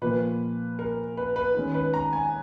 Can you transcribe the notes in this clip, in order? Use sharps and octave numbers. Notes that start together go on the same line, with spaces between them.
A#2 F3 A#3 B4
A#4
B4
B4
D#3 G#3 C#4
B4
A#5
G#5